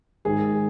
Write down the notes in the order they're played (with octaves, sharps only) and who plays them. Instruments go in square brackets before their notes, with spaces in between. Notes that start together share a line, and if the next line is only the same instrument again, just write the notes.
[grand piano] G#2 D#3 G#3 G#4